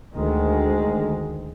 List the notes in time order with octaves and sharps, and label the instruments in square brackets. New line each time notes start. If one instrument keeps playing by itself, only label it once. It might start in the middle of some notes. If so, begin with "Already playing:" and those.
[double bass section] D2 D#3 G#3